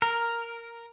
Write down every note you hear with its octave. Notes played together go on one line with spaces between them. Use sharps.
A#4